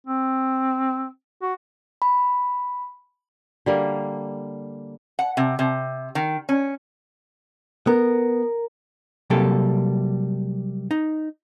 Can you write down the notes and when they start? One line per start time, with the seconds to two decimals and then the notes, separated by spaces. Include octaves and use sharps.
0.07 C4
1.42 F#4
2.02 B5
3.66 D3 G3 A#3
5.19 F#5
5.37 C3
5.59 C3
6.15 D#3
6.49 C#4
7.87 B3 A#4
9.30 C3 F#3 G3 A#3 G4 A4
10.91 D#4